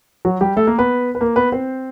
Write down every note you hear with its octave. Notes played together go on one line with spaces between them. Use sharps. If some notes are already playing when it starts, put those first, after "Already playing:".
F#3 F#4
G3 G4
A3 A4
A#3 A#4
B3 B4
B4
A#3 A#4
B3 B4
C4 C5